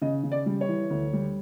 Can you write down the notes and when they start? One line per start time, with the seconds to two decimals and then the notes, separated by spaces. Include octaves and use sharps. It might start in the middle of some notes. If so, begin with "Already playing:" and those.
0.02 C#3 D#5
0.23 C#3
0.32 D5
0.46 G3
0.61 C#5
0.69 E3
0.90 D2
1.13 G3